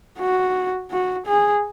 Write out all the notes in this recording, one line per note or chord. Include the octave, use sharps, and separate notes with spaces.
F#4
F#4
G#4